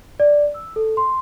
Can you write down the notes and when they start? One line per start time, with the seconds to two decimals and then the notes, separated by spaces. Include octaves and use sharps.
0.20 D5
0.54 E6
0.76 A4
0.97 C6